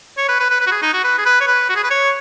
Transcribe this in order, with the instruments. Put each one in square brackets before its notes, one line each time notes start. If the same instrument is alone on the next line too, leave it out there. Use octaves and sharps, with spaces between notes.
[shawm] C#5
B4
B4
B4
B4
F#4
G#4
D#4
F#4
B4
G#4
B4
C#5
B4
F#4
G#4
B4
C#5